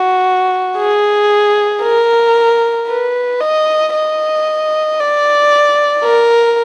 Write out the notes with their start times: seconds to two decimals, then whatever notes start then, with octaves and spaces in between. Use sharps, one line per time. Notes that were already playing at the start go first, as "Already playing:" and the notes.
Already playing: F#4
0.77 G#4
1.82 A#4
2.88 B4
3.40 D#5
3.94 D#5
5.00 D5
6.04 A#4